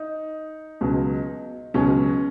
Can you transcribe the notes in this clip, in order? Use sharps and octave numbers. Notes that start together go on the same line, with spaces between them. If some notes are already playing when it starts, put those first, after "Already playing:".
Already playing: D#4
C#2 B2 F#3
C#2 B2 F#3 C#4